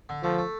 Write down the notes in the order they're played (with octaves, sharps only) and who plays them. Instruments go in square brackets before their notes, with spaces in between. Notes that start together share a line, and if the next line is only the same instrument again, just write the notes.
[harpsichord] D3
[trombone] F3 [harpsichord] A3
[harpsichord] A3